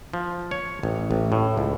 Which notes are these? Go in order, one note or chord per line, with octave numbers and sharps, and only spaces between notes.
F3
C#5
A1
A1
A2
C#2